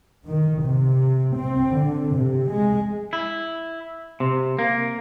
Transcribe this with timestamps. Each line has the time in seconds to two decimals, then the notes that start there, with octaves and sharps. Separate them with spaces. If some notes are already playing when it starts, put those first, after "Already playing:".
0.25 D#3
0.63 C3
1.35 C4
1.72 D3
2.14 C3
2.51 G#3
3.13 E4
4.20 C3
4.59 A#3